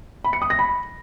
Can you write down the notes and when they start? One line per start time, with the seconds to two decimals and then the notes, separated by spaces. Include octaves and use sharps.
0.24 B5
0.33 C#7
0.42 D#6
0.50 A#6
0.59 B5